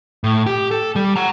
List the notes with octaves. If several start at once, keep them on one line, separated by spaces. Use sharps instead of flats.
A2
G4
A4
G3
F#5 A#5